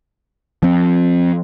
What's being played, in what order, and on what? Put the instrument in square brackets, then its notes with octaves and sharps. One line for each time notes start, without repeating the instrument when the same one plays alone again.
[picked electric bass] F3 C4